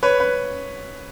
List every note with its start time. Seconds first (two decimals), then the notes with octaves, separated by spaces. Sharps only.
0.03 B4 C#5
0.20 B4